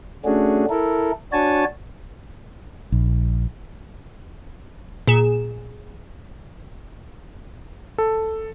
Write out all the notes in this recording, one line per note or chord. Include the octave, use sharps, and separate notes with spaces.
A3 C#4 D4 F#4 G#4
E4 A4 A#4
D4 F#4 C#5 G#5 A5
A#1
A#2 G#4 E7
A4